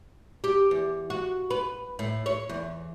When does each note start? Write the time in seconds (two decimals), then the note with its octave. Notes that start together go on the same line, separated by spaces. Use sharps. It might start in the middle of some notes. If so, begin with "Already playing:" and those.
0.44 G4
0.71 E2
1.10 F#4
1.50 B4
1.99 A2
2.26 C#5
2.49 E2